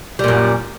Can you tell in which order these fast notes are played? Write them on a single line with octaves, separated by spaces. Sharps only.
G3 A#2 F#2